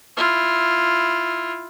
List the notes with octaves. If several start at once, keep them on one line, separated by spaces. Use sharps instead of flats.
E4 F4